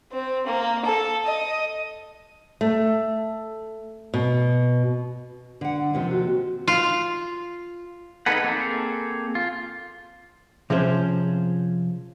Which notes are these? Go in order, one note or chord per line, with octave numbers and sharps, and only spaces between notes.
C4
A#3
A4
D#5
A3
B2
D3 F#5
D#2 C3 F3
F#4
F4
D#4 G#4 A4 B4 F#5
A#3 C4 G#4 A4
F4
C3 F3 C#4 G#4 C5